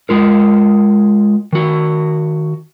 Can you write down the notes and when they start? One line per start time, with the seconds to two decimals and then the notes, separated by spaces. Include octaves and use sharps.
0.09 G#3 F4 A#4
1.53 D#3 F#4